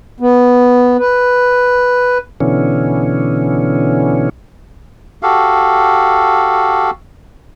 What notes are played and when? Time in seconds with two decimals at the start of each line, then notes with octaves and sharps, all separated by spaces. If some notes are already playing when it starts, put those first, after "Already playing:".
0.20 B3
0.99 B4
2.40 B2 D3 E3 C#4
5.22 F#4 G4 A4 F5